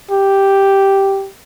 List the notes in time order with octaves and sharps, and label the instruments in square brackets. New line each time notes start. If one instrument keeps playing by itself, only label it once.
[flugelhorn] G4